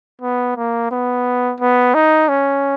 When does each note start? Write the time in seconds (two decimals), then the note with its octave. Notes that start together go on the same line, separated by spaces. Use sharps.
0.21 B3
0.57 A#3
0.91 B3
1.60 B3
1.94 D#4
2.29 C#4